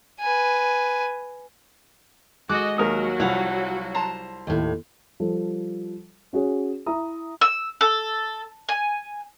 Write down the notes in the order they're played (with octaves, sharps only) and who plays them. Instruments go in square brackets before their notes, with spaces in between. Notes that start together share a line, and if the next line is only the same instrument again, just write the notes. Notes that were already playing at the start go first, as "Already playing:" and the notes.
[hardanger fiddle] B4 G#5
[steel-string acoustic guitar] G#3 [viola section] F#4 D#5 [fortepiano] D6 F#6
[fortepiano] D#2 A#4 D#6 [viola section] F#3 F#4
[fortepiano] C2 F3 [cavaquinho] E4 F5 F#5 [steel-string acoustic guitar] C#5
[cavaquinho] C5 A5 A#5
[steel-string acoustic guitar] D#2 A2
[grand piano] F3 G3 A4
C#4 F#4 G#4 C#5
E4 E5 A#5 D#6
[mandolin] E6
A4
G#5